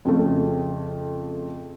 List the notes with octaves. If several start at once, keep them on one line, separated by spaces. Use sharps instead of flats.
F2 C#3 A3